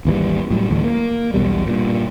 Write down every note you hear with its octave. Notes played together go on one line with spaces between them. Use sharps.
G#1 D#2 E3 G3
A2 F#3 G3
D2 A2 E3 A3
A#3
B1 E2 B2 G3
G2 A#2